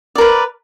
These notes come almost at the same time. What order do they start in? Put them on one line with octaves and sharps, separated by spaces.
D5 A#4 B4